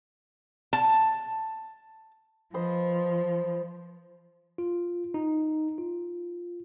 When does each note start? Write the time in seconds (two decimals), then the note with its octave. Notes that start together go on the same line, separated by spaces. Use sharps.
0.73 A5
2.54 F3 B4 C5 D#5
4.58 F4
5.14 D#4
5.78 F4